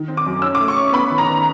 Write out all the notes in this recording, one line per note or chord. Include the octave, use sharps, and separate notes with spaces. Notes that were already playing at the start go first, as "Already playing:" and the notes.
Already playing: D#3
C4
D6
F#2
C#4 E6
D6
A3
C#6
C#4
B3 B5
D#3
A#5
D#3